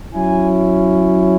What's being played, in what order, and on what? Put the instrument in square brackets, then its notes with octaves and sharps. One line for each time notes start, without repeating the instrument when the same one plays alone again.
[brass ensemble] F#3 C#4 E4 G#5